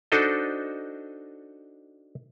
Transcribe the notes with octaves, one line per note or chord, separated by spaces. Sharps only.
D4 D#4 F#4 A4 C5 D#5